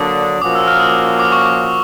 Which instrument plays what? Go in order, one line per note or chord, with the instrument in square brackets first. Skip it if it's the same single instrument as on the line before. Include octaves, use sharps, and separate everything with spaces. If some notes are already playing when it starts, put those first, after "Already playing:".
Already playing: [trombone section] D3 F#3 A#3 D4 [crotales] D#6
[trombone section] A#2 F3 A#3 C#4 F#4 [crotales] D6
[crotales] E6
F6
D#6
D6
C#6
D6